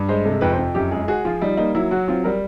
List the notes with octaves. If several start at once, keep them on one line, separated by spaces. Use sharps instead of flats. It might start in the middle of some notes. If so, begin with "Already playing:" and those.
Already playing: G2
G#3 C5
C3 A4
F2 B4
C5
F2
F#2 G4
G#3 G#4
F#4 G#4
F3 F4
G3 D#4
A#3 D#4
F#3 E4
F#3 F#4
C4 F4
G3 A#4